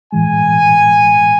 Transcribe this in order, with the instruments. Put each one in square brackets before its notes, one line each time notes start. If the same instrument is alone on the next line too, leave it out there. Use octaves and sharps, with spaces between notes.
[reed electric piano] A2 E3 G#3 [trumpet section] G#5